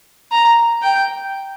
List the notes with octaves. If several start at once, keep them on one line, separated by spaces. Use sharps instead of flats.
A#5
G5